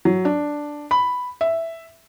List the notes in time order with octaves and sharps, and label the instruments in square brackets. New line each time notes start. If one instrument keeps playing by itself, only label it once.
[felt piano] F#3
D4
B5
E5